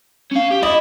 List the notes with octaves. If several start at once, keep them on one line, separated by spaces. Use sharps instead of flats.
C#4 F5
G4
E4 D#5